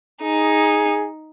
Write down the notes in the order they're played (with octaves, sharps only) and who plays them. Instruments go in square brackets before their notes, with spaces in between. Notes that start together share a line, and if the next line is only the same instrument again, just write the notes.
[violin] D#4 [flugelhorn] G#4